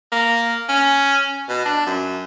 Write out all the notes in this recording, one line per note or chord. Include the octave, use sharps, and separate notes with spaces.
A#3
C#4
B2
D4
F#2